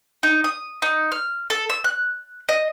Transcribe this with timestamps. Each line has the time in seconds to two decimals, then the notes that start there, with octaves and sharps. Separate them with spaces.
0.23 D#4
0.44 D#6
0.82 D#4
1.12 F6
1.50 A4
1.70 E6
1.84 F#6
2.49 D#5